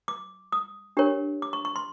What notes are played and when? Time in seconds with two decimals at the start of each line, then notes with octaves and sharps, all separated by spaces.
0.08 D6
0.52 D#6
0.97 D4 G4 A#4 C#5
1.42 D6
1.53 C#6
1.65 C#6
1.76 C6